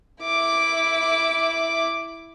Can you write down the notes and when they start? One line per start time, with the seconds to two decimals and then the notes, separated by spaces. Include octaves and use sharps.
0.22 E4 D6